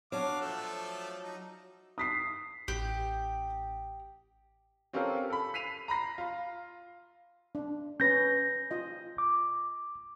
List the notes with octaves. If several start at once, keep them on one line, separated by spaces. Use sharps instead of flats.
F#3 D4 F5 D6
F3 A3 A4
D#4
D#6 B6 C7
A1 G4
C4 C#4 F4 G4 A4 A#4
A4 B5
B6 C7 D#7 F7
A#5 B5 A#6 C7
F4
D4
C#4 B4 G6 A#6
F4 D#5
D6